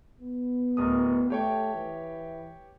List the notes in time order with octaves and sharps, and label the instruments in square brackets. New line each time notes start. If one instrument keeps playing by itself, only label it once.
[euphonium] B3
[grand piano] D1 A#4 D#6
[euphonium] A3 [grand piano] G4 C#5 G5
[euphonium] E3